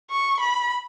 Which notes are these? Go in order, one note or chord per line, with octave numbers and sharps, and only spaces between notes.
C#6
B5